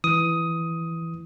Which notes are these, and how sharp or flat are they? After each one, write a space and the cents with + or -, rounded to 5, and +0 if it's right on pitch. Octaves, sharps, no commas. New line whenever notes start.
E3 +5 D#6 +10